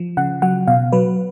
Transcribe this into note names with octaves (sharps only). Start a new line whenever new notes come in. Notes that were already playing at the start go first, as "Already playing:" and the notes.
Already playing: F3
C#3 F#5
F#3 F#5
B2 F5
F#3 B4